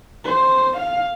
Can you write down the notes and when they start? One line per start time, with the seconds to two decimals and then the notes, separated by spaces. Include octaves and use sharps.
0.25 C5
0.77 F5